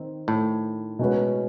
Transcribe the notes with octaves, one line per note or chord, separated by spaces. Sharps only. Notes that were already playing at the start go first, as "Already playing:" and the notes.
Already playing: D#3 C4
A2
B2 G#3 C#4 F#4 B4